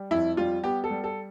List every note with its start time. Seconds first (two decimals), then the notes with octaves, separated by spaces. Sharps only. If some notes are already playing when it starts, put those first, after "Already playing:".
Already playing: G3
0.11 F2 E4
0.37 G3 F4
0.64 B3 G4
0.84 A4
0.90 G3
1.04 A4